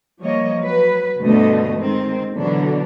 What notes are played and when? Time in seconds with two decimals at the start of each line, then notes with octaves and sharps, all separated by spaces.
0.21 F3 G3 A#3 C#5 D#5
0.60 F#3 B4
1.20 D2 G2 B2 D3 A3 D#5
1.77 D#3 G#3 C4
2.35 B2 D3 E3 F#3 D4